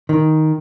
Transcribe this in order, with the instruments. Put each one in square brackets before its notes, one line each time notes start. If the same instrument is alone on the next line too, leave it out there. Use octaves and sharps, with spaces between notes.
[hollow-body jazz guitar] D#3